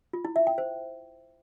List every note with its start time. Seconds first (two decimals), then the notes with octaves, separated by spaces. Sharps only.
0.13 F4
0.25 E4
0.36 E5
0.47 G5
0.58 C5